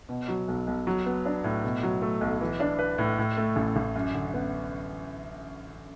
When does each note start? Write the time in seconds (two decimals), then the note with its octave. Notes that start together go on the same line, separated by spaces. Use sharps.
0.09 B2
0.28 F#3
0.48 B1
0.67 B1
0.87 F#3
1.06 B3
1.25 D4
1.44 A2
1.64 B2
1.83 F#3
2.02 A3
2.21 B1
2.41 E3
2.60 D4
2.79 B4
2.98 A2
3.18 A2
3.37 A3
3.56 A1
3.76 A1
3.95 F#2
4.14 D3
4.34 B3